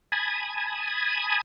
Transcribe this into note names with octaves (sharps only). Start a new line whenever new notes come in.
G#5 A5 B5 D#6 G#6